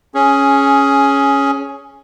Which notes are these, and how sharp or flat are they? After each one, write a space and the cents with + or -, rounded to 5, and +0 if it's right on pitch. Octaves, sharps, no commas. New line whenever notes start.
C#4 +0 G#4 +10